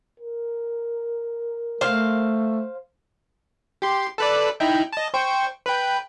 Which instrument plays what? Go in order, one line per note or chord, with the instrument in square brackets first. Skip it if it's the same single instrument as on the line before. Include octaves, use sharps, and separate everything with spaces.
[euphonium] A#4
[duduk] A3 [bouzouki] C5 F5
[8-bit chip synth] G4 C6
A4 B4 D5
D#4 E4 G5
D#5 A5
C5 G5 C#6
B4 G5